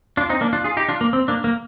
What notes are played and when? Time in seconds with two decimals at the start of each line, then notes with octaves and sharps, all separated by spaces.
0.17 D4 F4
0.29 C4 D#4
0.41 A#3 D4
0.53 D4 F4
0.64 F4 G#4
0.77 D#4 G4
0.89 D4 F4
1.01 A#3
1.13 C4
1.28 A#3 D4
1.44 A#3